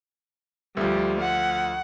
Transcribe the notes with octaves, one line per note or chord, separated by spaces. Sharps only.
D2 F3 G3
F#5